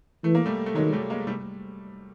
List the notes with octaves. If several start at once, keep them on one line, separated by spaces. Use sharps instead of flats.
E3 A3
A#3
G3 A3
A3
D#3 F#3 G#3
G3 A3
G#3 A#3
G3 A3